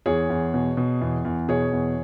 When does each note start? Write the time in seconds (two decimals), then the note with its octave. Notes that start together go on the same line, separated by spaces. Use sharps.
0.06 E2 G#4 C#5
0.30 E2
0.54 B2
0.77 B2
1.01 E2
1.25 E2
1.49 B2 G#4 C#5
1.73 E2